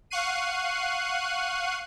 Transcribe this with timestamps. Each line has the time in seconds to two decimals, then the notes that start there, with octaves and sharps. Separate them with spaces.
0.10 F5 F#5 C#6 F#6 C7 D#7